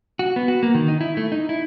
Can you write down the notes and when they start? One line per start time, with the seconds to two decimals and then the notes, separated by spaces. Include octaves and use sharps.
0.19 F#4
0.36 B3
0.48 F#4
0.63 A#3
0.75 D#3
0.88 D#4
1.01 E4
1.17 A3
1.32 D#4
1.49 E4